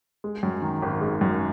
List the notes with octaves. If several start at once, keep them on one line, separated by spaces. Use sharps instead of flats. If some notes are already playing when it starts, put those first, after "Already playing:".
G#3
F#2
D#3
G#1
G#3
F#2